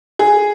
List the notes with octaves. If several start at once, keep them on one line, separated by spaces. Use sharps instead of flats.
G#4